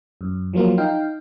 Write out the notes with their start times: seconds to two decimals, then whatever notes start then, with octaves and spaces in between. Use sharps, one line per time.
0.21 F#2
0.53 F3 F#3 A#3 F4
0.78 D#4 F5 G5